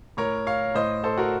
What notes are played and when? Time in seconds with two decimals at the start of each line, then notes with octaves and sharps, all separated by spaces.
0.17 A2 A#4 C#5
0.46 C#5 F5
0.75 A2 C5 D#5
1.04 A4 C5
1.17 F#4 A#4